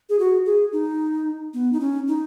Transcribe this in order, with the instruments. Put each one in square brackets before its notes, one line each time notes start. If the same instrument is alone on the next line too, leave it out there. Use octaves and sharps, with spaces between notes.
[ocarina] G#4
F#4
G#4
D#4
B3
D#4
C#4
D#4